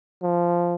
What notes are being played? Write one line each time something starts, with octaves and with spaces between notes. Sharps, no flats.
F3